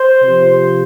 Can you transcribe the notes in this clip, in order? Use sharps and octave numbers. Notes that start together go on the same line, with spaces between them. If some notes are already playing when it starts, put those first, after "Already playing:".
Already playing: C5
C3 F3